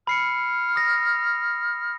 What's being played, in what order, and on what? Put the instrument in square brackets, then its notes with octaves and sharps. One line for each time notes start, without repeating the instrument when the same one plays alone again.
[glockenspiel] B5 C7 C#7 [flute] F6
[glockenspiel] D#6 A#6